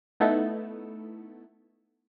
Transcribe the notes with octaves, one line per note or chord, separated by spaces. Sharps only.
A3 B3 D#4 E4 A4